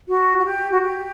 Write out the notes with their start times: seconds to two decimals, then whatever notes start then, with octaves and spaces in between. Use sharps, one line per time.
0.08 F#4
0.38 F#4
0.45 G4
0.71 F#4
0.81 G4